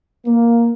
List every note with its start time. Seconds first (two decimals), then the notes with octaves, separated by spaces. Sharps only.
0.26 A#3